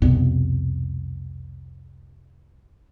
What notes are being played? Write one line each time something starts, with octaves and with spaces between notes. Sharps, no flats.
C2 F2 B2 B3